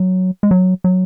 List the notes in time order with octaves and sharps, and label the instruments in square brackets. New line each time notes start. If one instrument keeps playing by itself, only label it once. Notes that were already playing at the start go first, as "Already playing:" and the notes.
Already playing: [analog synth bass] F#3
G#3
F#3
F#3